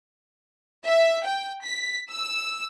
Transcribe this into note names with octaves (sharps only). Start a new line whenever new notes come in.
E5
G5
B6
E6